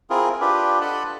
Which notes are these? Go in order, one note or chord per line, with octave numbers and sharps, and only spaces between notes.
C4 E4 F4 G#4 A#4
D4 F4 G4 B4
A4 D#5 F#5 A5 B5